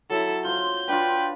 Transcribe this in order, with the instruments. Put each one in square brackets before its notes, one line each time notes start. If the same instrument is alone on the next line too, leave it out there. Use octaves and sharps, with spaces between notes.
[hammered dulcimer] F#3 [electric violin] E4 A4
[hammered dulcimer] F4 C5 [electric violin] G6
[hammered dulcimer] D4 F4 [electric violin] B4 [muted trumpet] G5